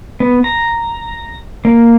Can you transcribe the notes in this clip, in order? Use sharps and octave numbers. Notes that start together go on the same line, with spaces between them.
B3
A#5
A#3